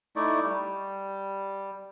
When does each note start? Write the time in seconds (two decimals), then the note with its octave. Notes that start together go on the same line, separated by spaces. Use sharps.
0.16 A3 D#4 E4 D5
0.43 G3